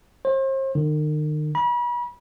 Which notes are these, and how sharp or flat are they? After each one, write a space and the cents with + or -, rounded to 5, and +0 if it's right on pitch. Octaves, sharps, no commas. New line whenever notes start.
C5 +40
D#3 -40
B5 -40